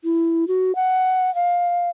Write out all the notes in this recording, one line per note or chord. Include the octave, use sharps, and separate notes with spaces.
E4
F#4
F#5
F5